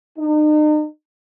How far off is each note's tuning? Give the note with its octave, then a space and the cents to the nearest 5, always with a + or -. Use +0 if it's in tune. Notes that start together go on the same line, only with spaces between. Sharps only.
D#4 -40